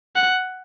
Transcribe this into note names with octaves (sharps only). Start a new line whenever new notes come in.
F#5